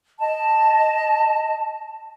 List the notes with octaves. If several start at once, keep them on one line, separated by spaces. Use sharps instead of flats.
D#5 A5